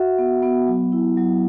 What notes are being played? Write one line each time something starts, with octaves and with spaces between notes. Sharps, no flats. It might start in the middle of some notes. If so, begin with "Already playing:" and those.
Already playing: F#4 E5 F#5
B3
B3
F#3
E4
F#3